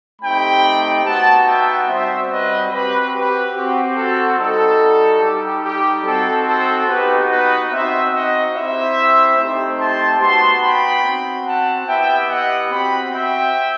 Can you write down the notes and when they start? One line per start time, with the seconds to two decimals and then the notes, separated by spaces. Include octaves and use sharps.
0.22 A3 C4 D#4 G4 G5 B5
1.05 B3 D#4 F#4 F#5 A5
1.47 E5 G5
1.88 G3 C4 F#4 C5 E5
2.30 B4 D#5
2.72 C4 F#4 G4 B4
3.13 G4 B4
3.54 C4 F#4 G4
3.97 A4
4.38 G3 D#4 F#4 A4
5.21 G3 D#4 G4
5.63 G4
6.04 C4 D#4 F#4 A4
6.46 A4 C5
6.88 B3 D#4 F#4 G4 B4
7.29 B4 D#5
7.71 C4 D#4 F#4 C5 E5
8.12 D#5 F#5
8.54 C4 E4 G4 C5 E5
9.37 A3 C4 D#4 G4
9.79 A5 C6
10.21 B3 D#4 F#4 A5 C6
10.62 G5 B5
11.04 C4 F#4
11.45 F#5 A5
11.87 B3 E4 G4 E5 G5
12.29 D#5 F#5
12.71 C4 F#4 G5 B5
13.13 E5 G5